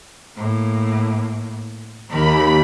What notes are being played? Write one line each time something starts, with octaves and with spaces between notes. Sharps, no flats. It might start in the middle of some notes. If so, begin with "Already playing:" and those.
A2 A#3
D#2 D#3 D#4 B5